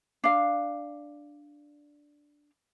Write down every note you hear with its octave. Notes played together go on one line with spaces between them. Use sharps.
D4 F5